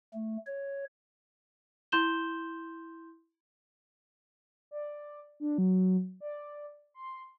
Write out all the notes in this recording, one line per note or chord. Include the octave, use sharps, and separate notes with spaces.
A3
C#5
E4 C6 G6 E7 G7
D5
D4
F#3
D5
C6